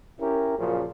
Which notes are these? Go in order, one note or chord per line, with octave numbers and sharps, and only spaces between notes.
C#4 E4 G4 A#4
F#2 A#2 C#3 F3 A#3